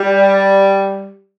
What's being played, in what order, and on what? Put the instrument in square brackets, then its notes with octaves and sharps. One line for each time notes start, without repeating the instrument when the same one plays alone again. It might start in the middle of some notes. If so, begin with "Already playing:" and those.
Already playing: [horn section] G3